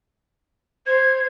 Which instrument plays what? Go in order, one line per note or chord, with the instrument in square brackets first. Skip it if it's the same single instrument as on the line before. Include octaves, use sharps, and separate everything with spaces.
[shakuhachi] C5 [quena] G#6